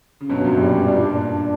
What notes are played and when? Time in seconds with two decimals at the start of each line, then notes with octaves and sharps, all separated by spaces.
0.20 C#3
0.29 G2 B2 F#3
0.44 F#2 A#2
0.59 F#2 G3
0.74 G2
0.88 G2 D4
0.96 A#2
1.04 G2
1.17 D4